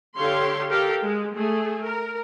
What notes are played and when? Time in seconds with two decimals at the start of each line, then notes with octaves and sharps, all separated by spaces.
0.18 D3 G4 A4 C#5 F5 C6
0.70 G4 A4 A#4 F5
1.02 G#3
1.34 A3 G#4
1.83 A#4